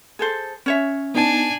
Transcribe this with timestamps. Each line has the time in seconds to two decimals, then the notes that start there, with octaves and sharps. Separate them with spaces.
0.19 G#4 A4 C5
0.66 C#4 C#5 E5
1.15 B3 D4 D#4 G#5 A5